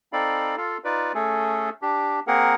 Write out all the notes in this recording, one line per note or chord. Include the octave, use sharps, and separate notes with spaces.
C4 D#4 A4 D5 F5 B5
F4 A4 F5
D#4 F4 B4 D5
A3 C#4 G#4 A4
D4 G4
A#3 C4 G#4 A#4 F#5